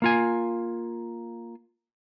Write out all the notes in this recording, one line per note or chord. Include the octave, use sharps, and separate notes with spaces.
A#3 F4 G#5